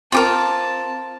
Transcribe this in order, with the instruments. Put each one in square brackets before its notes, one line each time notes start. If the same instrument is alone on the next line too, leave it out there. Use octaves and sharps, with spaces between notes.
[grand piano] C4 [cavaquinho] F4 G4 A#4 [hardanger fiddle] A5